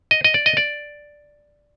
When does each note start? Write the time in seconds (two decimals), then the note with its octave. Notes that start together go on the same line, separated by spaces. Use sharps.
0.11 D#5
0.24 D#5
0.34 D5
0.46 D#5
0.57 D5